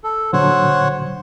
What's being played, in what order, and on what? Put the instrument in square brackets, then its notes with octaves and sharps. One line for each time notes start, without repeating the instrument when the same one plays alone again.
[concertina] A4
[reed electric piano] A#2 D3 F#3 [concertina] C5 C#5 F#5